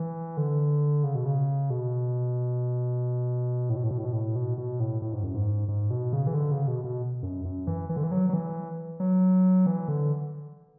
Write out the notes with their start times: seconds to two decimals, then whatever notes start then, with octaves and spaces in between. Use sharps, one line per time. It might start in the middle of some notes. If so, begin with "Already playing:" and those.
Already playing: E3
0.37 D3
1.04 C#3
1.15 B2
1.25 C#3
1.70 B2
3.69 A2
3.77 B2
3.84 A2
3.91 B2
3.98 A2
4.05 B2
4.13 A2
4.35 B2
4.58 B2
4.80 A2
5.02 A2
5.13 G#2
5.23 F#2
5.34 G#2
5.68 G#2
5.90 B2
6.13 C#3
6.27 E3
6.34 D3
6.51 C#3
6.68 B2
6.84 B2
7.23 F#2
7.45 F#2
7.67 E3
7.89 E3
7.96 D3
8.04 E3
8.12 F#3
8.29 F#3
8.33 E3
9.00 F#3
9.66 E3
9.88 D3